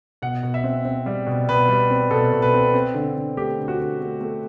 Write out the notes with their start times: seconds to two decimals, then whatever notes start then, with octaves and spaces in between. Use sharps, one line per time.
0.22 B2 F#5
0.43 B2
0.54 E5
0.64 C4
0.85 C4
1.06 G3
1.27 B2
1.49 B2 B4
1.69 G3
1.90 C4
2.11 B2 A4
2.33 B2
2.42 B4
2.54 C4
2.74 C4
2.94 D3
3.16 D3
3.37 A3 G4
3.58 D3
3.68 F#4
3.79 D3
4.01 A3
4.21 A3